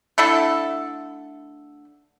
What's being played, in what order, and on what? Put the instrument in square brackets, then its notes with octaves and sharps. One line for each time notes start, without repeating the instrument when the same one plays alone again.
[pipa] D3 A3 E4 A4